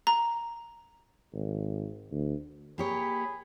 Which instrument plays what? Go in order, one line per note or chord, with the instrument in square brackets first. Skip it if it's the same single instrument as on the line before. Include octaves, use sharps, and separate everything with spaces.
[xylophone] A#5
[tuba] G#1
D2
[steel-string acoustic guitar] A#3 G4 C#5 [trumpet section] G#4 B5